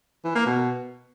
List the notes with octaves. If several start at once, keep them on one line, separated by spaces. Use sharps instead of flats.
E3
A#3
B2